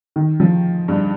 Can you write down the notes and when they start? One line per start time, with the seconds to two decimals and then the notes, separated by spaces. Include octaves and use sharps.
0.16 D#3
0.40 F3
0.88 G2